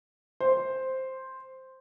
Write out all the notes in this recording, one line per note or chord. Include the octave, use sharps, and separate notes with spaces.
C5